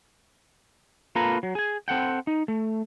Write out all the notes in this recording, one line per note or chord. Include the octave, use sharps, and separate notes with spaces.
A#3 F4 A4 B4 A#5
F#3
G#4 G#5
C4 A4 F#5 G5
D#4
A3